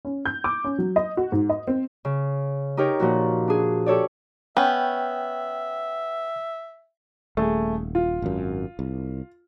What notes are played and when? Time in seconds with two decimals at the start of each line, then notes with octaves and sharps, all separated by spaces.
0.05 C#4
0.25 G6
0.44 D6
0.64 C#4
0.79 F#3
0.96 D#5
1.17 F#4
1.32 G#2
1.49 D#5
1.68 C4
2.05 C#3
2.77 D#4 G4 A#4 C#5
3.00 A#2 F3 F#4
3.48 D4 G#4
3.86 G4 A4 C#5 D5
4.57 B3 C#4 E5 G5
7.37 D#1 A3 G#4
7.95 F4
8.22 G#1 F#2
8.79 C2